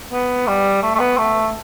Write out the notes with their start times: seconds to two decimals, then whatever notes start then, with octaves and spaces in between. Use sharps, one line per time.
0.12 B3
0.47 G3
0.83 A3
0.95 A3
1.00 B3
1.18 A3